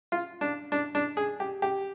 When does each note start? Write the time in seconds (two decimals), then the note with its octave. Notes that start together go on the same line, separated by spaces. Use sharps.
0.12 F4
0.41 D4
0.72 D4
0.95 D4
1.17 G#4
1.40 G4
1.62 G4